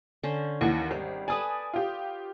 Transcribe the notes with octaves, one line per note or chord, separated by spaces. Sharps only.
D3 C#4 C5
D#2 E3 F#5 C#6
G#1 G3
A4 B4 D5 G#5 D#6
F4 G4